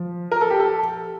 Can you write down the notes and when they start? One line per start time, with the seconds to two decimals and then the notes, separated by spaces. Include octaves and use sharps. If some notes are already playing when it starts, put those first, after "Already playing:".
Already playing: F3
0.31 A#4
0.41 A4
0.50 G4
0.60 A4